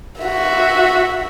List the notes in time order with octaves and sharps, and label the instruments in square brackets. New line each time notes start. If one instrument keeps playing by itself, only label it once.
[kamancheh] F#4 E5